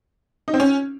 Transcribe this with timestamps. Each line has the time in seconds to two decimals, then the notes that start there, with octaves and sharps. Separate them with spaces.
0.48 D#4
0.54 C4
0.60 C#4